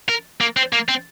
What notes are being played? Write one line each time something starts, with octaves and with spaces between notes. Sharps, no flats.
A#4
A#3
C4
A#3
C4